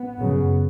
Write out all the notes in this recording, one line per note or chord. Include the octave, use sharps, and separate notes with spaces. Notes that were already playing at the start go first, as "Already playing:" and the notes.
Already playing: B3
F#2 C#3